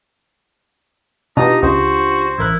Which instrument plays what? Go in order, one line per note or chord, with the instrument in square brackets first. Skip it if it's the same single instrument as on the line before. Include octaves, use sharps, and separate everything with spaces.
[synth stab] B2 [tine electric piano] D4 F4 G4 [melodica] D#4 A#5 D#6 [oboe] D#5
[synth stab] C#2 [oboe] F#4 [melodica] C5
[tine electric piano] A1 A#4 F#6 [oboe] E4